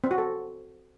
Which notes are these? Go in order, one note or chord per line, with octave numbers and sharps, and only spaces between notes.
C4
F#4
A4